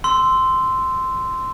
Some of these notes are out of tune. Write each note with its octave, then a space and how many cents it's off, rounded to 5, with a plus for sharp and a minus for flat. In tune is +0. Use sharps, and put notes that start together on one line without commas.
C6 -10 E6 +0